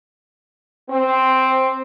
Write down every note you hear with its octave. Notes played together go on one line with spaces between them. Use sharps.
C4